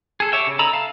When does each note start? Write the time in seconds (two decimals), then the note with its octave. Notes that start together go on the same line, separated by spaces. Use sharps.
0.20 G#4 A4
0.32 G4 C#5 E5 G5
0.47 C#3
0.59 D#4 A4 A#5 B5 E6
0.72 E5 F5 A5